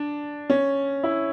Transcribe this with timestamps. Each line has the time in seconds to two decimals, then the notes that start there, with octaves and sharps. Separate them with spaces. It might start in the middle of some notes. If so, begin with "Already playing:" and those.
Already playing: D4
0.50 C#4
1.04 E4